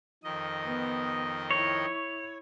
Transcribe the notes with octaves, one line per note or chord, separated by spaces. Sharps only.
F2 D#3 D#5
B3
E4 C#5